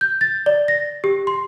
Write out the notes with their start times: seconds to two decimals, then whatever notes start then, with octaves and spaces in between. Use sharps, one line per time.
0.01 G6
0.21 A6
0.46 D5
0.68 A#6
1.04 G4
1.27 C6